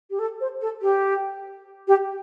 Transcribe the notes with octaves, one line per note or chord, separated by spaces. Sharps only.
G4
A4
C5
A4
G4
G4